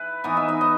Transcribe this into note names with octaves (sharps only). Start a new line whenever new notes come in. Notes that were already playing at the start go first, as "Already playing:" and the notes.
Already playing: E4 B4
E3 B3 D#4 D#5
E5
D#5
D#5